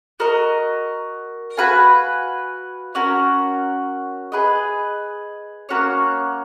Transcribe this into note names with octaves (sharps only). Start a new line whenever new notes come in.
F#4 A#4 D#5
F#4 B4 F5 G#5
C#4 F#4 A#4
G#4 B4 D#5
A#3 C#4 F#4 C#5